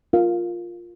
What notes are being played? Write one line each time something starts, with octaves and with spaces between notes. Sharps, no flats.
F4 A#4 F5